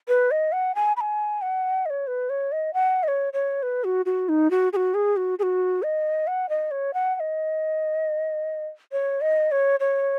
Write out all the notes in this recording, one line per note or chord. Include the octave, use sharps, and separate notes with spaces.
B4
D#5
F#5
G#5
B5
G#5
F#5
D#5
C#5
B4
C#5
D#5
F#5
D#5
C#5
C#5
B4
F#4
F#4
D#4
F#4
G#4
F#4
G#4
F#4
G#4
F#4
D#5
F#5
D#5
C#5
F#5
F#5
D#5
C#5
D#5
C#5
C#5